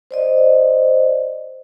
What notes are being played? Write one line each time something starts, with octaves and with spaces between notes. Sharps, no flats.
C5 D5 D#5